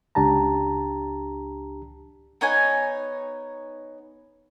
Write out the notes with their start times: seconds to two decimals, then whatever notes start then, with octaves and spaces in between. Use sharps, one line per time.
0.15 C#2 D4 G4 A5 A#5
2.41 B3 D#4 C#5 G#5